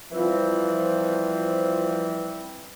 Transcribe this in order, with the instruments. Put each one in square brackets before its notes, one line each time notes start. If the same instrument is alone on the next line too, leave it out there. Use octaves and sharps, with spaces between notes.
[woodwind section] E3 G3 C4 [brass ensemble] F3